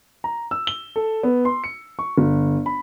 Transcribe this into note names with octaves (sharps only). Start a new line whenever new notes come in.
A#5
E6
G7
A4
B3
C6
C#7
C#6
G1
B5